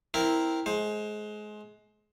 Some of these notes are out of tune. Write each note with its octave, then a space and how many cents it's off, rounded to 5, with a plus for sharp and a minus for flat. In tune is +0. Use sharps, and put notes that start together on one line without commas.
C4 +0 E4 -5 A#4 +0
G#3 +25 C5 +15